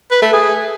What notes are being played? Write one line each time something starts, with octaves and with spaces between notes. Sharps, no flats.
B4
A3
G#4